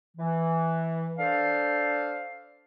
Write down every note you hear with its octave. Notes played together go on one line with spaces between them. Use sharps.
E3
D4 A4 C5 F5